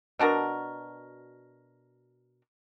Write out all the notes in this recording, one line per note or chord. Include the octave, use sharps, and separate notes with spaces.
B2 D4 F#4 A#4